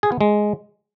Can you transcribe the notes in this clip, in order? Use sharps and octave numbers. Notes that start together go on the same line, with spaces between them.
G#4
B3
G#3